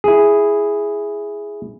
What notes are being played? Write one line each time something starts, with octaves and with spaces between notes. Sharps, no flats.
E4 G#4